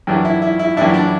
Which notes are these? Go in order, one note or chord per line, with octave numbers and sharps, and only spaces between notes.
F#2 E3 G3 D4
E4
E4
E4
F#2 E3 G3 D4 E4
D4